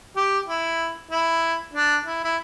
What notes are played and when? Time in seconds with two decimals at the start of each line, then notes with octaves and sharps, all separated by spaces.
0.16 G4
0.48 E4
1.11 E4
1.74 D4
2.06 E4
2.25 E4